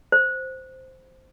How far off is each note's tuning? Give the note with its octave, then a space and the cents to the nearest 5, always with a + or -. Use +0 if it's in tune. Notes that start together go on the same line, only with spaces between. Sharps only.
C5 -5